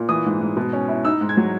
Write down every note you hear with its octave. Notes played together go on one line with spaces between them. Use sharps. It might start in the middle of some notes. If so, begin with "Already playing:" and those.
Already playing: A#2
E3 D#6
G#2
G#2
B2
C#4
E4
D#4 E6
G#2
G#6
F#3